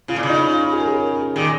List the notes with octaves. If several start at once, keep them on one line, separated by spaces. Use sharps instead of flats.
C#3 F4
A#2
C#3
D#4
F4
G#4
A#4
G#4
A#2 D#3 G#4